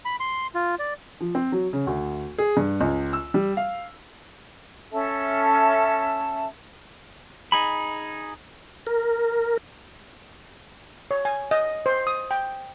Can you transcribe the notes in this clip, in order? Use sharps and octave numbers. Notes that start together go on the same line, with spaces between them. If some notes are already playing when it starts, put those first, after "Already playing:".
B5
C6
F4
D5
F3
C4
F#3
C#3
D2
G#4
G2
C#2
E6
G3
F5
C#4 A4 E5 A5
D#4 G#4 B5
A#4
C#5
G#5
D#5
C5
D#6
G5